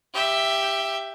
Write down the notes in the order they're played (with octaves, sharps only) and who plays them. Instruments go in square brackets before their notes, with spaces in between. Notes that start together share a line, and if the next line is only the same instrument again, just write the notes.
[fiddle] G4 E5